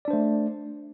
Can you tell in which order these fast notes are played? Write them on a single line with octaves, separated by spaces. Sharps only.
D5 D4 C5 A3